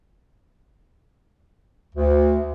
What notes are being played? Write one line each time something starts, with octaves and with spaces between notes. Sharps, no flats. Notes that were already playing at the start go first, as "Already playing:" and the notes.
D2